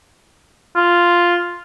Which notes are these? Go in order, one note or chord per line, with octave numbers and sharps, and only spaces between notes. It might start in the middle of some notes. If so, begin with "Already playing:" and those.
F4